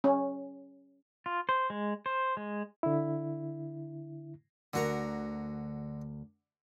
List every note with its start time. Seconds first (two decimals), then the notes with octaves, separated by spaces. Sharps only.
0.04 C#4
1.26 F4
1.49 C5
1.70 G#3
2.06 C5
2.37 G#3
2.83 D3 E4
4.74 D2 D3 F#4 A#4 A#5